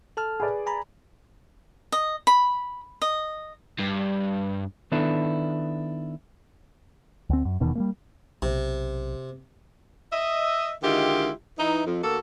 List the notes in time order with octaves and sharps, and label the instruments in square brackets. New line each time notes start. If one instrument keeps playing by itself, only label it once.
[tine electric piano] A4 A5 F6
[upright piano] G#4 B4 D5
[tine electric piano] G#5 A#5 B5
[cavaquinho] D#5
B5
D#5
[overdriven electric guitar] G2
[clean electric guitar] D#3 B3 D4 E4 A4
[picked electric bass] D2 C4
F#2
D#1 E2 B2 D#3
G3 A3 A#3
[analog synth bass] B1 [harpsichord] C3
[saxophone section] D#5 E5
D3 D#3 G#3 E4 F4 G4
E3 D#4
F2
D2 A#3 F#4 A4